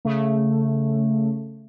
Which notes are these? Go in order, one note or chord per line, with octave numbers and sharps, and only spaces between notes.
C#3 A3